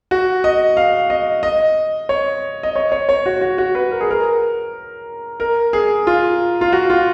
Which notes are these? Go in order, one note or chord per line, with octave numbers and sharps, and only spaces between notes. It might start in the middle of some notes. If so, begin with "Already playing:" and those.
F#4
D#5
F5
D#5
D#5
C#5
D#5
C#5
C#5
C#5
F#4
F#4
F#4
B4
A#4
G#4
A#4
A#4
G#4
F4
F4
F#4
F4